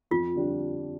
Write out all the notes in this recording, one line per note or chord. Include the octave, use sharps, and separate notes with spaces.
F2 F4
D3 G3 D4